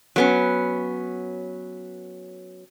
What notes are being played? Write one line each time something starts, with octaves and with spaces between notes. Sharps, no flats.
F#3 B3 C#4